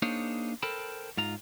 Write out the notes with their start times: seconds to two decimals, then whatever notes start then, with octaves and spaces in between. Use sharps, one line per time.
0.02 A#3 D4 D#4 G#4 C5 C#5
0.63 A4 A#4 C5 G5 A5 B5
1.17 G#2 F4 A#5